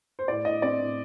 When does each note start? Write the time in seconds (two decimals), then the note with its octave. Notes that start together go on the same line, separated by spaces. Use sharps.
0.19 C5
0.28 A2 D5
0.45 A2 D#5
0.62 C4 D5
0.80 A2